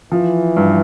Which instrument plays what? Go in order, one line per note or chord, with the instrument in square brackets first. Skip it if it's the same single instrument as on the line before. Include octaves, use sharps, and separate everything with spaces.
[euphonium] E3 [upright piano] F3
[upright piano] G2